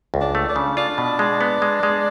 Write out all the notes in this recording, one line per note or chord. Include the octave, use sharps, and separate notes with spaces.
C#2
D4
A3
D4
C#3
D4 F4
B2
G#3
B3
G#3
G#3